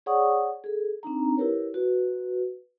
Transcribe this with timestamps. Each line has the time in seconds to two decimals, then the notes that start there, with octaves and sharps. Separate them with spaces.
0.06 G#4 C#5 D5 F#5 C#6 D#6
0.64 G#4 A4
1.03 C4 D4 D#4 A#5
1.37 E4 G4 A#4 B4 C#5
1.74 F#4 B4